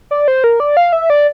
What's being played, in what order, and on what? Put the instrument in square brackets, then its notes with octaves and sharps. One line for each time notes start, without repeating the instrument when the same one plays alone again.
[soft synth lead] D5
C5
A#4
D5
F5
E5
D5